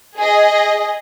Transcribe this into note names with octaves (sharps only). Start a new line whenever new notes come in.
G#4 D#5